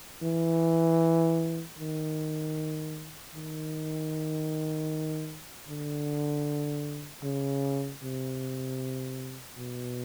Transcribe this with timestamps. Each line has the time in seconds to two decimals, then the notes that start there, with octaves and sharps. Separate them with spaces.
0.22 E3
1.79 D#3
3.34 D#3
5.68 D3
7.23 C#3
8.02 C3
9.57 B2